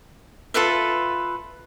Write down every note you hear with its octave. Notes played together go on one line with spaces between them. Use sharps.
F4 A4 B4 E5